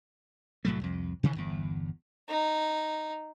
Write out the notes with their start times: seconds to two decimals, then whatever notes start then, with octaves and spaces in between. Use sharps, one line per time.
0.65 C2 A2 F#3 A3
0.81 C2 F2
1.23 C3 D#3 E3
1.36 G1 E2
2.29 D#4